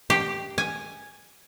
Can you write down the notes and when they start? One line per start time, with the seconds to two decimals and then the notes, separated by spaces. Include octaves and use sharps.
0.10 G4
0.58 G#5